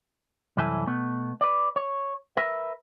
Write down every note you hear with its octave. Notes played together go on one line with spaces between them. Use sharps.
C2 F#2 E3 E4 A4 G#5
B2 A3 B3
B4 D5
C#5
A#4 B4 E5